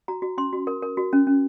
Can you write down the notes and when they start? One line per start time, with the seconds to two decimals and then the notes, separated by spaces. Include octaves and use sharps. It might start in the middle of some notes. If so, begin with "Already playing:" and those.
0.08 F#4 A#5
0.22 F#4
0.37 C#4 C6
0.53 F#4
0.67 A#4
0.82 A#4
0.97 F#4
1.13 C#4
1.27 C#4